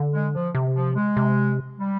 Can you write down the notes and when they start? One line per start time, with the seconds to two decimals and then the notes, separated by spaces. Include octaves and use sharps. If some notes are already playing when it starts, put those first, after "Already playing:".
Already playing: D3
0.13 G#3
0.35 F3
0.55 C3
0.75 F3
0.95 G#3
1.17 C3
1.79 G3